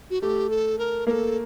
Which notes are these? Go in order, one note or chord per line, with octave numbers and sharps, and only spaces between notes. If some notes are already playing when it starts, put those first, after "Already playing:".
F#4
A3 G4
A4
A#4
A#3 A4 A#4